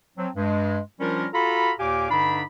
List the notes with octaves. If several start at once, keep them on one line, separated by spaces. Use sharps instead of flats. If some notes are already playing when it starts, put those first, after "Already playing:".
F3 F#3 C4
G2 G#3
F3 G3 C#4 D4 F4 A#4
F4 F#4 A4 F5 A#5 B5
D#2 A#2 G4 F5 G#5 D6
G2 D3 D4 D#4 B5